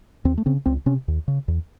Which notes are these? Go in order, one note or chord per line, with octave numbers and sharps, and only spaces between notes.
D#2 C4
A3
C#3 C4
C#2 C4
C3 C#4
D#2
C#3
E2